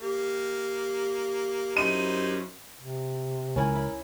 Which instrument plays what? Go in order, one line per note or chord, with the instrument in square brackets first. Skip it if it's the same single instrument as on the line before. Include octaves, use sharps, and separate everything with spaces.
[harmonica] A#3 [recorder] G4
[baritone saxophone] F#2 [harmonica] D#4 E4 C5 [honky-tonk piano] D#7
[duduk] C3
[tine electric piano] C#2 G#5 [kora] C#4 E4 [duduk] A#4
[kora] E4